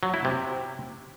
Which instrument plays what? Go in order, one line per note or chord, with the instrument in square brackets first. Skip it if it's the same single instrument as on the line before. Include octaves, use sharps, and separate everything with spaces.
[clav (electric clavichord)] F#3
E4
C3